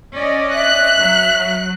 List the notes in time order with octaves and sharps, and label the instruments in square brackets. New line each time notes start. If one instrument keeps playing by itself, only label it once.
[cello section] C#4 D5 D#5
[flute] E5 [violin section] F#6
[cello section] F#3